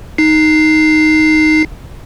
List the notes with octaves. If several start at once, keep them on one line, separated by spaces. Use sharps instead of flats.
D#4 C7